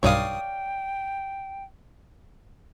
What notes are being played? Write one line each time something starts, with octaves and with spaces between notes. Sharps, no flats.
B1 G2 C#5 D5 F5 G5 D#6